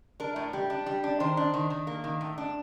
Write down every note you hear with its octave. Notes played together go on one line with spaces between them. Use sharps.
D4 A#4
A2
G3
D4
G3
D4
D#3 C5
D4
D#3
D#3
A#3
D#3
A2
D4